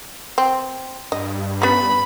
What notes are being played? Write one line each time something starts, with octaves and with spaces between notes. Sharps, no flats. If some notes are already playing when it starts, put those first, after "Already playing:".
C4
G2 D#5
B3 C#4 B5